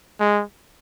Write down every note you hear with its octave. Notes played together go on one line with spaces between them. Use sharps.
G#3